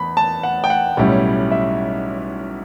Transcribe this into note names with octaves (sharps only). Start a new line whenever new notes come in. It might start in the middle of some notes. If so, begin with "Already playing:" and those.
Already playing: E2 B5
A5
F#5
G5
F#5
B1 A2 G3 C#4 E4
E5